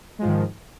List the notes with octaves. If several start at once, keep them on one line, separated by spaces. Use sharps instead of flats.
G#2 D#3 F3 G#3